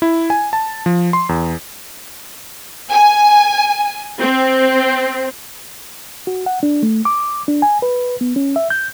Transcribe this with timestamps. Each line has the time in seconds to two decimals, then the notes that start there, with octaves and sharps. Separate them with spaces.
0.02 E4
0.30 G#5
0.53 A5
0.86 F3
1.13 C6
1.29 E2
2.91 G#5
4.20 C4
6.27 F#4
6.46 F#5
6.63 D4
6.83 A3
7.05 D6
7.48 D4
7.62 G#5
7.82 B4
8.21 B3
8.36 C#4
8.56 E5
8.70 G6